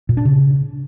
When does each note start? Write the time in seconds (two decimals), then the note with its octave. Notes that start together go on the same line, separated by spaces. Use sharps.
0.09 A#2
0.17 D4
0.25 C#3